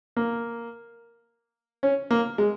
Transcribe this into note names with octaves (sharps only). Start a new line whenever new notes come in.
A#3
C#4
A#3
G#3